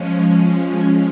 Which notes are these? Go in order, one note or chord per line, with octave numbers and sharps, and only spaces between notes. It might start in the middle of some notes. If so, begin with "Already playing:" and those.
Already playing: F3 G#3 C#4